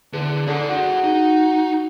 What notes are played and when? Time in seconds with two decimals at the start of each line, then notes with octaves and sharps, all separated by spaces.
0.13 E2 D3
0.48 D3 G#4 F#5
0.69 F#4
1.04 D#4